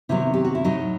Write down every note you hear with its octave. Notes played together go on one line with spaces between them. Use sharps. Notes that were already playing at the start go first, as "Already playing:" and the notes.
C3 D#3 F#3 B3 E4
G4
F#4
E4
A2 F#3 A3 D#4